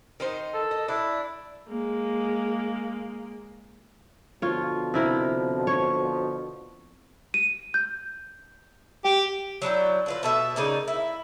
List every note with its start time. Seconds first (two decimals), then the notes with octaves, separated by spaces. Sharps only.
0.20 D#3 D#4 C5
0.54 A4
0.71 D#5
0.88 D4 E4
1.68 G#3 A#3
4.42 B2 D3 F3 F4 C#5
4.94 C3 E4 A#4
5.67 C#5
7.34 D#7
7.74 G6
9.05 G4 G5
9.62 F#3 D4 E4 G5
10.06 D3 F4 B4
10.23 B2 A4 E5
10.56 C#3 A#3 D#4 D5
10.88 E4